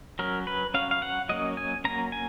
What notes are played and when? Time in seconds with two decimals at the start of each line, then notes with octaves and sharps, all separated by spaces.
0.19 F#3 C#4 A#4
0.47 B4
0.74 F#3 C#4 F5
0.91 F5
1.02 F#5
1.29 F#3 A#3 C#4 D#5
1.57 G#5
1.84 F#3 A#3 C#4 A#5
2.12 G#5